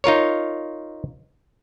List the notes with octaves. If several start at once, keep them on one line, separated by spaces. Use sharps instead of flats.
D#4 F4 A#4 C#5